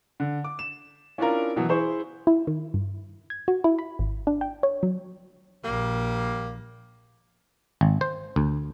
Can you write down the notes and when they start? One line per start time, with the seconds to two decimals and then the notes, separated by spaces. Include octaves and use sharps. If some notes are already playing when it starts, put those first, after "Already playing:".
0.20 D3
0.44 D6
0.59 E7
1.18 C#4 D4 E4 F4 A#4
1.56 B2 E3 F#3
1.69 E4 G#4 C5 C#6
2.27 E4
2.47 D#3
2.74 G2
3.30 G#6
3.48 F#4
3.64 E4
3.79 B5
3.99 G#1
4.27 D4
4.41 G5
4.63 C#5
4.83 F#3
5.64 A#1 G3 A#3
7.81 G#1
8.01 C5
8.36 D2